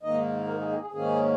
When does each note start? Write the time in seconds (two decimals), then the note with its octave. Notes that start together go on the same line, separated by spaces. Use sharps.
0.03 G#2 D#3 A#3 D#4 D#5
0.48 A#4
0.58 G#4
0.70 G#4
0.81 G#4
0.92 G#2 D#3 A#3 C#4 G#4